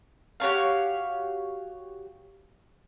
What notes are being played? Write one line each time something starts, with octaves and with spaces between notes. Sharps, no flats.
F#4 G4 C#5 F5